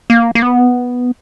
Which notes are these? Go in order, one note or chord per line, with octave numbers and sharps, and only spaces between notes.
A#3
A#3
B3